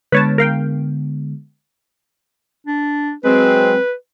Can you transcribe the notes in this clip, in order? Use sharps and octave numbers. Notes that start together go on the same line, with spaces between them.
D3 G#3 B3 B4 C#5 A5
A#4 F5 G5
D4
F#3 G#3 C4 B4